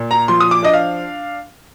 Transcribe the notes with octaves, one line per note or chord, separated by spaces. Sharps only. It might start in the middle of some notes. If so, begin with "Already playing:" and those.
Already playing: A#2
A#5
F3 C6
D#6
D6
D4 D#5
F5